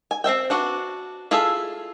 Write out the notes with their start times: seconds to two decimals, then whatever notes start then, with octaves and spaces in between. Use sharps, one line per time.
0.11 G#5
0.24 C4 C5 E5 G5
0.50 D4 F#4 B4
1.31 E4 F4 G#4 A4 E5